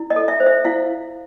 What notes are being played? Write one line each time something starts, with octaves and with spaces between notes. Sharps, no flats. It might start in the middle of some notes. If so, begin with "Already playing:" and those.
Already playing: E4
D#5
A4
E5
C5
E5
E4 F5